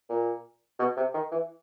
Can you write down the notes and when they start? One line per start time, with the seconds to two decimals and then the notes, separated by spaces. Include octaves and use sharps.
0.09 A#2
0.79 B2
0.97 C3
1.14 D#3
1.31 E3